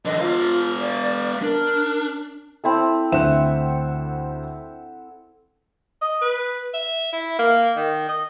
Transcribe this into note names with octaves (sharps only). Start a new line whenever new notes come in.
D3 E3 D#5
B3 F4 F5
D5
D4 A#4
C4 E4 A4
D2 C4 E5 F#5 E7
D#5
B4
E5
E4
A#3
D#3
D#5